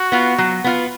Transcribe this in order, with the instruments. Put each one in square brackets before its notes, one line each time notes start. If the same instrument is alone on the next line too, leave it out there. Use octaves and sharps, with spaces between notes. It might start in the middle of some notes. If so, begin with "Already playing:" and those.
Already playing: [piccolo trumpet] F#4
[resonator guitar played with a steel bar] B3 F4
F#3
B3 F4